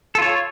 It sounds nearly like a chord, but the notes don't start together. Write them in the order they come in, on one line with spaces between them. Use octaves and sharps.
A4 F4 C#5